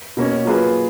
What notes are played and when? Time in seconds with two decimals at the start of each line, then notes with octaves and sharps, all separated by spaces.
0.17 B2 A#3 C#4
0.45 F#3 A#3 F4 G#4 B4